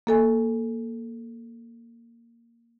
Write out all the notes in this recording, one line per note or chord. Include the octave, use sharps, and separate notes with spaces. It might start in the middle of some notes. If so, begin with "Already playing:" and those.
A#3 A4 G#5